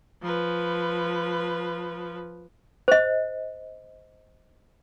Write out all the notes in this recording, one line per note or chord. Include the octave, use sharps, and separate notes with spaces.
F3 B4
C5 D#5